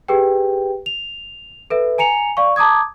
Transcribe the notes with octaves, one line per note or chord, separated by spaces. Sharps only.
G4 G#4 B4 G5
F7
A4 B4 E5
G#5 A#5 C#7 F7
D5 F5 C#6
A5 A#5 D6 D#6 G#6